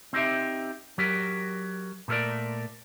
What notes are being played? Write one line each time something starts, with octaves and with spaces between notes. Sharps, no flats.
C4 D#4 G4 E5
F#3 G4 A#4
A#2 A3 G#4 A#4 D5